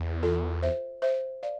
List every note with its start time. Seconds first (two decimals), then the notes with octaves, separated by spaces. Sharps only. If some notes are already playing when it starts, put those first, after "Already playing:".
Already playing: E2
0.23 F4 A4
0.62 C5 E5
1.02 C5 E5
1.43 D5 F5